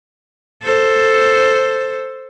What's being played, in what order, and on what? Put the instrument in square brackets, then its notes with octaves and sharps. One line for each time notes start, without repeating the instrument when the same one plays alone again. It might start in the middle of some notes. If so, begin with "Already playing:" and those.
[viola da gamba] A4 C5